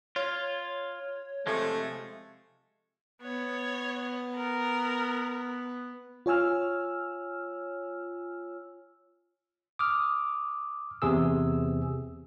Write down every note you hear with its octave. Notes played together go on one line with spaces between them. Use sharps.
F4 C#5
C3 F3 G#3 A3
B3 C#5
A#4
F4 C#5 G#5 E6 F6
D6 D#6 F6
E2 C3 G#4 E6